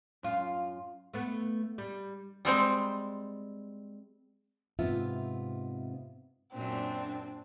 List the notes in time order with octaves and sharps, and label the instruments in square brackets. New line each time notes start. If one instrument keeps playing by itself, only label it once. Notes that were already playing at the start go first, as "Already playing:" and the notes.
[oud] F#2 F4
A3 B3
G3
[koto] G3 G#3 C4
[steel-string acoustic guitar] G#2 C3 B3 C4 F4 E5
[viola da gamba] F#2 A#2 [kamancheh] C4 [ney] D4